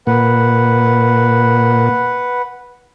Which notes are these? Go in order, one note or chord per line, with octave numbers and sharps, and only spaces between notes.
A#2 B4 F#5